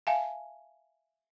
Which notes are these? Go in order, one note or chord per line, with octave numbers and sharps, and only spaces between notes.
E5 F5 G#5 A5